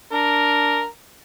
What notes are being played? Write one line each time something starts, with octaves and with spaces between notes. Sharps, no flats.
D4 A#4